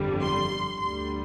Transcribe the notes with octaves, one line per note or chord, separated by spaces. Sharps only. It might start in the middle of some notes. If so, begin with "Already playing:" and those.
Already playing: G1 F2 D3 G3
C6
D2 D3 G3 C6